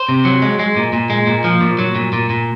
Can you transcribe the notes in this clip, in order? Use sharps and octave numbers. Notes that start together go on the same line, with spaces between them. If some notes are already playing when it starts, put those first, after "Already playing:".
Already playing: C5
C3
F#3
G#3
G#3
A#2
A#2
G#3
A#2
F3
A#2
F#3
A#2
A#2
A#2